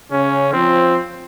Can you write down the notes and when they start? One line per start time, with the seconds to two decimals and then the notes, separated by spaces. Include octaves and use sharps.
0.11 C#3 C#4
0.53 F3 C4